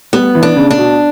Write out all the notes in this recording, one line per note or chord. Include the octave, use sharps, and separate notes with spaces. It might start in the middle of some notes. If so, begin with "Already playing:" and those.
G3 B3
E3
D4
C#3
D4
B2